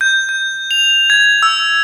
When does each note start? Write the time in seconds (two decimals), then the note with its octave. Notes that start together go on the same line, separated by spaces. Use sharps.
0.01 G6
0.29 G6
0.71 F7
1.10 G#6
1.43 E6